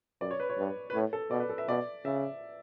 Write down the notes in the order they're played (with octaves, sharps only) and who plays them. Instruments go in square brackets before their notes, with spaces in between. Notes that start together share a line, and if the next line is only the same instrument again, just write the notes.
[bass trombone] F#2 [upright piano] D5
[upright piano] C#5
B4
C#5
[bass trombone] G2
[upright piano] B4
[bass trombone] A2 [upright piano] C#5
[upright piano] A4
[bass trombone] B2 [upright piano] D5
[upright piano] B4
A4
E5
[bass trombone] B2 [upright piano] D5
[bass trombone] C#3 [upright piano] E5